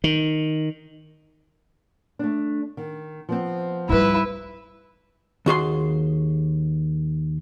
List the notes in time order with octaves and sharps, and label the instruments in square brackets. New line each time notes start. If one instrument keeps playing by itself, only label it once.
[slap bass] D#3
[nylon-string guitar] A3 D4
D#3
F3 B3 C4
[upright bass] G#2 G3 [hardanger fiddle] E4 B4
[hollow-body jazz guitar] D#2 F#4 G#4 C6